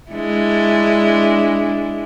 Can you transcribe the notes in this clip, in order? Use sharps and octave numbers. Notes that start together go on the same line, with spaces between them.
G#3 D4 E4